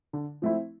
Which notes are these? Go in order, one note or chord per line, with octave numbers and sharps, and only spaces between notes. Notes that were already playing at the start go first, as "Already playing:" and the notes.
D3
F3 A3 C4 E4